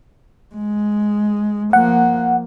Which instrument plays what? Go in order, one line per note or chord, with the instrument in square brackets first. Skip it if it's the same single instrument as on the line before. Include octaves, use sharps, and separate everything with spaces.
[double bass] G#3
[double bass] F3 A#3 [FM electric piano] F#5